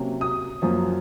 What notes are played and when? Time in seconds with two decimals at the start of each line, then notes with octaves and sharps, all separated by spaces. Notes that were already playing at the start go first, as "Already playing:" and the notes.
Already playing: C3 F#3 A#3 C#4
0.21 D#6
0.62 F#2 F3 A#3 C#4